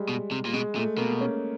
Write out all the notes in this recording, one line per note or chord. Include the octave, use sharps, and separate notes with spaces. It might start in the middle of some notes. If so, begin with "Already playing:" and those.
Already playing: G3 G#3
B2
C3
A#2
B2 G#3
A#2 A3
B2 A#3
C#4